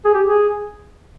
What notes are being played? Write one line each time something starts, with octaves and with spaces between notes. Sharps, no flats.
G#4
G4
G#4